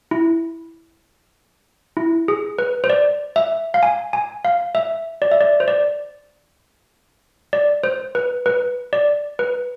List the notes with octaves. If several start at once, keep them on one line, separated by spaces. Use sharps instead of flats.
E4
E4
G#4
B4
C5
D5
E5
F5
G#5
G#5
F5
E5
D5
E5
D5
C5
D5
D5
C5
B4
B4
D5
B4